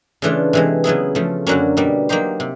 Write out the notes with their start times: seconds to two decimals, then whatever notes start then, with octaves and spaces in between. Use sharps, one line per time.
0.22 C#3 E3 A3 D4 F4
0.53 C3 E3 G#3
0.84 C#3 F#3 B3 E4 G#4
1.15 C#3 F3 A3
1.47 F#2 D3 F#3 A#3 C#4
1.77 B2 G3 A#3
2.09 F#3 A#3 D#4 G4 C5
2.40 C3